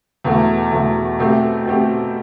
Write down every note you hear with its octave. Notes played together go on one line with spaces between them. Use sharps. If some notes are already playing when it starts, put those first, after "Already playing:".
E2 B2 A3
E2 B2 A3
B2 A3 C4 G4
B2 A3 C4 G4